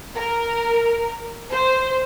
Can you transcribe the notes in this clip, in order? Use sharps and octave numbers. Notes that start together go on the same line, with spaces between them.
A#4
C5